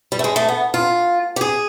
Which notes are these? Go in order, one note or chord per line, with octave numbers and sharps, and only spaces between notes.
G3
A3
G#3
A3
B3
F4
G4
G#4